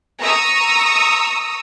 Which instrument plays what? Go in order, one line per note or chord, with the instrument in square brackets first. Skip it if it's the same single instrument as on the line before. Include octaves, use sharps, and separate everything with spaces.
[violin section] A#5 C#6 D#6 E6